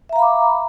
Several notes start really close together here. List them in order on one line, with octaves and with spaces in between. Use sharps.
E5 A#5 F5 B5 D6